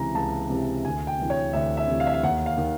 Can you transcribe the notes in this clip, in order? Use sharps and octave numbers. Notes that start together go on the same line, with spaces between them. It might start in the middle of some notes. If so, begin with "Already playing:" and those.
Already playing: C#2 C3 E3 A#5
C#2 A5
C3 E3
D2 G#5
G5
C3 E3
C#5
D2 E5
E5
C3 E3
F5
E5
F5
D#2 F#5
F5
D#3